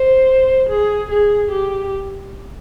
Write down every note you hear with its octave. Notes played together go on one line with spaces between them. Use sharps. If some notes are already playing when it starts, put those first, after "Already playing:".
Already playing: C5
G#4
G#4
G4